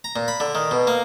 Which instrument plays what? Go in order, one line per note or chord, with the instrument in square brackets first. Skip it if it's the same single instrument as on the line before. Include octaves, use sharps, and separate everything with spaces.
[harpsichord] A#5
A#2
B5
D3
D#3
B2
A#3